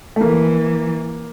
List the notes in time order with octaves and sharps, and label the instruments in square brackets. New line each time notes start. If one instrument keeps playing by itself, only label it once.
[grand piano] A3
[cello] E3 [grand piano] A#3